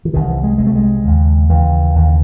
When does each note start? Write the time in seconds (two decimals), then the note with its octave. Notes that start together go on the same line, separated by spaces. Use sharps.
0.05 E3
0.13 C2 C3 D#3
0.28 E3
0.43 G#3
0.58 C2 C3 G#3
0.67 A3
0.75 G#3
1.04 D#2 C#3
1.49 D#2 C#3 E3
1.95 D#2 C#3